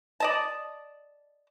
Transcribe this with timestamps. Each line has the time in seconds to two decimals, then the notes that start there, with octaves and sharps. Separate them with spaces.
0.20 D5 D#5 A5